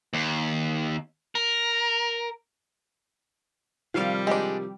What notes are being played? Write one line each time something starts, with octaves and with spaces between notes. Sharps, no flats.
D#2
A#4
C3 D#3 F3 G3 F5
G#3 D4 G4